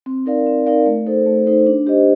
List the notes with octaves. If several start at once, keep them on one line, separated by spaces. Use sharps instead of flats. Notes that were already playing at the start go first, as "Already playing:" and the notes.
C4
D#4 A#4 D5 F5
C4
D#4 A#4 D5 F5
A3
D#4 A4 C5
A3
D#4 A4 C5
D4
G4 C5 D#5